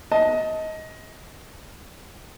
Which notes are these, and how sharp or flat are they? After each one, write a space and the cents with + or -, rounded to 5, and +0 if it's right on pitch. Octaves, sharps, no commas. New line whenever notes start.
D#5 +20 A5 +0